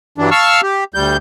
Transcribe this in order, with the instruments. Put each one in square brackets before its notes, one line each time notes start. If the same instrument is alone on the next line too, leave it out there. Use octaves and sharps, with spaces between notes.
[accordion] G2 E3 F#3 D4
F5 A5 C#6 E6 F6
G4
D2 G3 G6